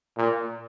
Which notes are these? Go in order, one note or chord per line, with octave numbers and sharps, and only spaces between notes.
A#2